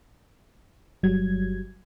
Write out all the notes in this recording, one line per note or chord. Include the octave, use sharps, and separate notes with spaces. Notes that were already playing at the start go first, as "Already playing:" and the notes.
G1 F#3 G3 G#6